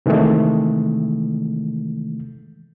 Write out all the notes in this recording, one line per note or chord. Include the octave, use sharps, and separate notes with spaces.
C3 D#3 E3 G#3 A3